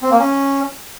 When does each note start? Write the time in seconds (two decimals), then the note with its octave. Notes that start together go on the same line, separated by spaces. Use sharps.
0.02 C4
0.11 A#3
0.20 C#4